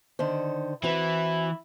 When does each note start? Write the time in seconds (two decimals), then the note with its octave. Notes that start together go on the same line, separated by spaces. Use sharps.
0.19 D3 D#3 C5
0.83 E3 C4 E4 F#4 B4